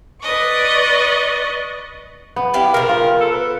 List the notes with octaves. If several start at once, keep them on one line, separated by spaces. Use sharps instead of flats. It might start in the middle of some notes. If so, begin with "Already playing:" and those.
B4 D5 D#5 C#6
B3
E4 G4 F5
C#3 F3 A#4
F4
A4
B4